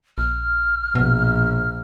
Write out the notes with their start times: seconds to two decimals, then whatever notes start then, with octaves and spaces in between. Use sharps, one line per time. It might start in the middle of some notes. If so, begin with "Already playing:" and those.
0.18 A#1 F6
0.95 A#1 B2